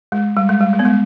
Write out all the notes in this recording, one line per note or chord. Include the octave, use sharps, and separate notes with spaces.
G#3
G3
G#3
G3
G#3
B3
G#3